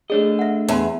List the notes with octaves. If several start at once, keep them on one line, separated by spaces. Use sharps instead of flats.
A3 D4 G#4 C#5 D#5
E5 F#5
E2 C#5 A5 C6